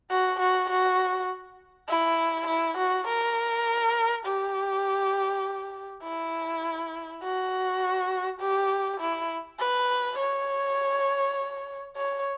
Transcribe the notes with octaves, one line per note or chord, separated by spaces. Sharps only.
F#4
F#4
F#4
E4
E4
F#4
A#4
G4
E4
F#4
G4
E4
B4
C#5
C#5